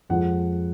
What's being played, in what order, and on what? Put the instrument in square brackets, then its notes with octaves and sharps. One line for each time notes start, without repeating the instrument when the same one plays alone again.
[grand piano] F2 F3 G#3 F#5